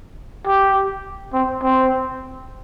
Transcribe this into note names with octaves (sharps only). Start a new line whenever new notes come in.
G4
C4
C4